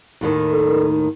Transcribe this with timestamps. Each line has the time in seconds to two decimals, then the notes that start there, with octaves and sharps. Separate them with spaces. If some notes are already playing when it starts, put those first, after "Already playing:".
0.21 D#2 A2 D#3
0.52 A4 A#4